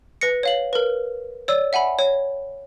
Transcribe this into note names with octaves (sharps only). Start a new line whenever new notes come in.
B4 A#6 C#7
C#5 F5 F#7
A#4 B4
C#5 D5 E6
E5 F#5 G#5 B5
C#5